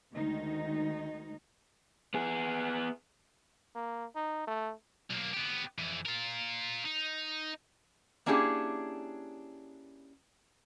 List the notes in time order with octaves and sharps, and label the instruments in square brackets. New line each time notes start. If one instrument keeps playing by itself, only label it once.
[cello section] D2 D#3 G#3 D#4
[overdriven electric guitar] B3 G#4
[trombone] A#3
D#4
A3
[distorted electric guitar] B1 A#3
B3 G4
F2 E3
F4 A#4
D#4
[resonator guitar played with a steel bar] A#3 C#4 D4 E4 G4 G#4